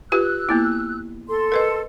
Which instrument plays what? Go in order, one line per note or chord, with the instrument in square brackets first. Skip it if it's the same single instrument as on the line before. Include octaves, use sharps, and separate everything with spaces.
[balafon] F4 G4 B4 [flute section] E6 F#6
[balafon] A#3 B3 E4
[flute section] A4 C6
[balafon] A#4 B4 D#5